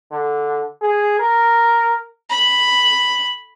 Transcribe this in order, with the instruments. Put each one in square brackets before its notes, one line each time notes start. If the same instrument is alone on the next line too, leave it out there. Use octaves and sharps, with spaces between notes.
[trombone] D3
G#4
A#4
[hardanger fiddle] B5